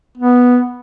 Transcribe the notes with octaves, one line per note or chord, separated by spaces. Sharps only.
B3